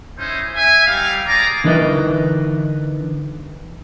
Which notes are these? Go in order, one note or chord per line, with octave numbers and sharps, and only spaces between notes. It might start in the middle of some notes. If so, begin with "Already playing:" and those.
C#4 D#4 E4 C5
E5 G#5
G3 D#4 F5
G#4 D5 A#5
D3 E3 D#4 A#4 B4 D#5